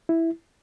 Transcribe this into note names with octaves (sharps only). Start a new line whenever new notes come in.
E4